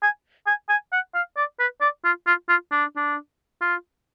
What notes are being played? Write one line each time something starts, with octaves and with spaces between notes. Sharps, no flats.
G#5
G#5
G#5
F#5
F5
D5
B4
D5
F4
F4
F4
D4
D4
F4